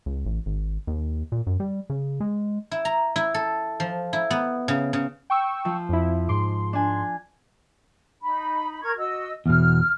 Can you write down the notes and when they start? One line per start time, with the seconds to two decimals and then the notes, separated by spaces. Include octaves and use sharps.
0.06 C#2
0.26 A1
0.46 G#1
0.87 D#2
1.32 A#2
1.47 F#2
1.60 G3
1.90 C#3
2.21 G#3
2.71 E4
2.85 A#5
3.16 E4
3.34 A4
3.80 F3
4.13 E4
4.31 B3
4.68 C#3
4.93 C#3
5.30 G5 C#6 E6
5.65 F3
5.89 F2 E4
6.29 G#2 C6 D6
6.73 D4 G#5
8.22 D#4 B5
8.82 A#4 C#6 G#6
8.97 F#4 D#5 E6
9.46 E2 B2 F6